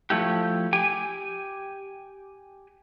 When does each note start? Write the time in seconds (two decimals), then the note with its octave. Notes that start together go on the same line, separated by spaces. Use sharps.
0.10 F3 A3 E4 G4
0.73 G4 G5 G#5